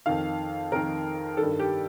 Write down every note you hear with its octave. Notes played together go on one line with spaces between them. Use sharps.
F2 D#3 F5
F2 D#3 A#4
G2 D#3 A4
G4